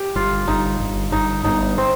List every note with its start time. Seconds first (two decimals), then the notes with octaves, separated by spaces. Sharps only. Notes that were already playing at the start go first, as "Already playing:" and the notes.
Already playing: G4
0.15 G1 F4
0.48 G1 D#4
0.80 G1
1.12 G1 D#4
1.44 G1 D#4
1.78 C4